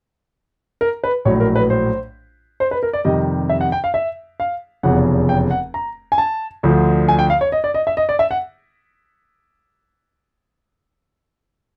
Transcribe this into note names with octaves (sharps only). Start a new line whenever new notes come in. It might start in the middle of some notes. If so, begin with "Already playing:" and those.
A#4
B4
A#1 A2 F#3 C#5
A#4
B4
C5
C5
B4
A#4
D5
F2 C3 D#3 G3 D#5
E5
F#5
G5
F5
E5
F5
F1 E2 C#3 F3 F#5
G5
F#5
A#5
G#5
A5
D2 D3 F3
G#5
G5
F5
C#5
D#5
D5
D#5
E5
D#5
D5
E5
F#5